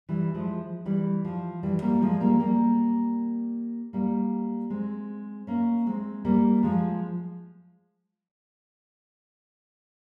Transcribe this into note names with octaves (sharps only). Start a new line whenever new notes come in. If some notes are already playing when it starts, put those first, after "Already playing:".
E3 G3
F3 G#3
E3 G3
F3
E3 G3
G3 A#3
F3 G#3
G3 A#3
G3 A#3
G3 A#3
G#3 C4
A#3 C#4
G#3 C4
G3 A#3
F3 G#3